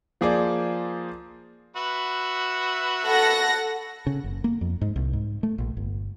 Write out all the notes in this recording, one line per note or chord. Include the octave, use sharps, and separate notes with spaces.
F3 A#3 G#4 C5 D5
F#4 B4 E5
A4 F#5 A#6
C#3
F#1
A#3
F2
G#2
C2
G#2
A3
A#1
G1